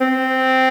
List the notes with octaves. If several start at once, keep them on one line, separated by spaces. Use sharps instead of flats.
C4